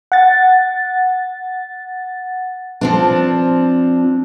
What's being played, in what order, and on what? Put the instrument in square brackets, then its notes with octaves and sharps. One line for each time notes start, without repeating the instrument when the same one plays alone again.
[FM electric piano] F#5 A6
[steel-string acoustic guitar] F3 C4 D4